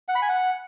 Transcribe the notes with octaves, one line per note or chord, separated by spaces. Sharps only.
F#5
B5
G#5
F#5